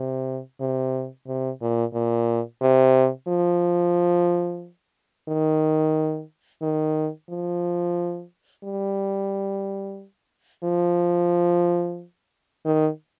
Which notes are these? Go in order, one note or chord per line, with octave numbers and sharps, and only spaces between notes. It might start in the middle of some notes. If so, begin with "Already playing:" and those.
Already playing: C3
C3
C3
A#2
A#2
C3
F3
D#3
D#3
F3
G3
F3
D#3